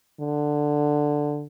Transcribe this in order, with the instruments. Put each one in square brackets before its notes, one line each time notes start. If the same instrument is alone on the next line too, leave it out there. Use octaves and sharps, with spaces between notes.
[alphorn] D3